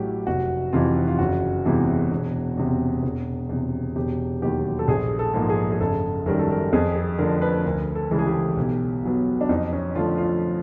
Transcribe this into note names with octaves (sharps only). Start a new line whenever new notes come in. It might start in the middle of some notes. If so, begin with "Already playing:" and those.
Already playing: A1 A2 F#3 G4
F1 F#4
F2 C3 E3 F4
F4
F#1 F#4
E2 C3 E3 G#3
E1
E2 C3
E1
E2 C3
E1 G4
D#2 D#3 F#3 G4
A4
A#1 G#4
A4
G#2 F3 A#3
G#4
G#4
F#1 A4
F#2 D#3 G3 A#4
A4
A#4
F2 G#4
G#4
D3 F3 A3 A#4
B4
D2 A#4
A4
C#3 E3 G#3 A4
G#4
G4
B1
B2 F#3 B3
D4
F2 D#4
C#4
D3 F3 A3 F4
F4